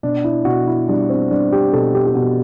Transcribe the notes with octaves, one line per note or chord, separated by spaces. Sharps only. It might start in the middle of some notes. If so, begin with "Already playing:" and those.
B2 D4
E4
B2 F#4
E4
G3 D4
C4
G3 D4
G4
B2 A4
G4
G4
B2 F#4